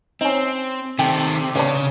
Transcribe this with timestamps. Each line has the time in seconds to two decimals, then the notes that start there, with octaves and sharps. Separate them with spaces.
0.21 C4 C#4 D#4
0.99 C3 D#3 A4 G5
1.55 A1 C#3 D4